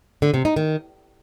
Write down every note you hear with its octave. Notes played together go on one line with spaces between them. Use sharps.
D3
C3
D#4
D#3